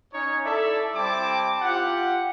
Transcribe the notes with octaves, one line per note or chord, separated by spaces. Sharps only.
C#4 D#4 C#5
E4 A4 D5 E5
G3 C4 E4 A5 D6
F4 G4 F#5